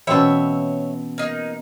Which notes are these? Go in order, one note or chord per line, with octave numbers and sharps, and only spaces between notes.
B2 E3 C4 C#4 B4 C#5 E5
A#3 D#4